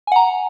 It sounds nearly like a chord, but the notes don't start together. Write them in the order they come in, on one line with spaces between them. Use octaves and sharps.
G#5 F#5 A#5